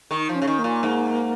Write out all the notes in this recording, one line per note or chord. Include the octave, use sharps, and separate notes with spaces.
D#3 D#4
F3
C#4
C#3
D#3
A#3
A#2
G#2